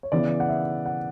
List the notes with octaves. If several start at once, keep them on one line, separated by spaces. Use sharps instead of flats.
C#5
C#3 E3 B3 D5
F#5
E5
F#5